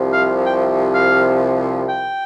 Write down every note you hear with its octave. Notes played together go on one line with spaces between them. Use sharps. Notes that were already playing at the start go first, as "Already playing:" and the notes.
Already playing: C2 C3 F3
F5
G5
F5
G5